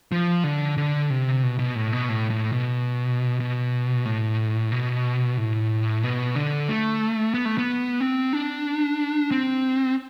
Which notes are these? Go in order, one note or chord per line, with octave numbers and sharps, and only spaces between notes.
F3
D3
D3
C3
B2
B2
A2
B2
A2
A2
B2
B2
A2
B2
A2
B2
D3
A3
B3
A3
B3
C4
D4
C4